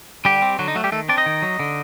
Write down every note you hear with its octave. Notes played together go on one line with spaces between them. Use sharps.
D3 G3 G4
C4
D3 F#3 F#4
D#4
F#3 A3 F#4
G3 G4
D#3 A3 A4
C4 D4 D5
D#4 D#5
D#3
F#3
D3